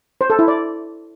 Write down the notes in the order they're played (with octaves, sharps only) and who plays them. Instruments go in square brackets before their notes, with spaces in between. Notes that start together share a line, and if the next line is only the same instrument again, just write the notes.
[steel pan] C5
A4
E4
D5